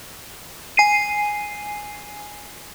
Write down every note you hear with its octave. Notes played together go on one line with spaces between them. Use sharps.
G#5 C7 D#7